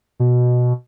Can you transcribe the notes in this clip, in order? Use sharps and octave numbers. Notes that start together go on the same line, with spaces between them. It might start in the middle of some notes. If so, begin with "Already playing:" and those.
B2